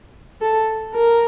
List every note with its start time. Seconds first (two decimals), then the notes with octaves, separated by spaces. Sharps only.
0.41 A4
0.95 A#4